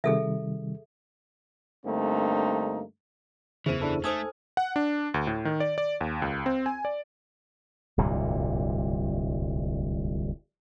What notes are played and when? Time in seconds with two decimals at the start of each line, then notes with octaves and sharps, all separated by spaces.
0.04 C3 D#3 G3 G#4 A4 E5
1.85 G2 D3 A3 A#3 C4 D#4
3.66 F#1 E2 E3 E4 G#4 C5 D#7
3.82 D4 E4 A4
4.04 A3 D#4 A4 C5 G#5 D#6 G#6
4.57 F#5
4.76 D4
5.14 D2
5.27 A2
5.45 D#3
5.60 D5
5.78 D5
6.01 D#2
6.22 C#2
6.46 C4
6.66 G#5
6.85 D5
7.98 D1 C2 G2 A#2